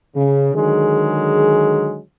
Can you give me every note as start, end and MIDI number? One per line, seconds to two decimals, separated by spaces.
0.15 0.54 49
0.55 2.00 50
0.55 2.00 51
0.55 2.00 54
0.55 2.00 56
0.55 2.00 68